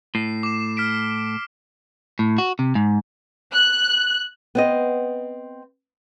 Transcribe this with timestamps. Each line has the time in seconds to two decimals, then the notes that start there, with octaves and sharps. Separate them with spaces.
0.15 A2 C7
0.43 D6 E7
0.77 F6 B6 D7
2.19 A2
2.38 F#4
2.59 C3
2.75 G#2
3.52 F#6
4.55 B3 C4 D#5